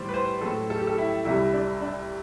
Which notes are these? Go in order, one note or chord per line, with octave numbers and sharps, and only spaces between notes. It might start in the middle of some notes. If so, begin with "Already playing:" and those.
Already playing: A2 E3 G3 C5 D5
B4
C5
A2 F#3 A4
A4
G4
A4
E4
C2 C3 G3 E4
D4
D4